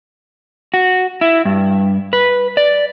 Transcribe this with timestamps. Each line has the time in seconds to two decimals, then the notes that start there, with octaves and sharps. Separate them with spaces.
0.74 F#4
1.21 E4
1.45 G2
2.13 B4
2.57 D5